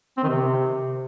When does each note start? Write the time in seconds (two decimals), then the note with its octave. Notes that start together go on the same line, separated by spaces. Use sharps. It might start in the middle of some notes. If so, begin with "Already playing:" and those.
0.18 C4
0.23 D#3
0.29 C3